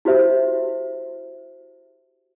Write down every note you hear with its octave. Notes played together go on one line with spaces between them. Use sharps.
E4 F#4 G4 C5 E5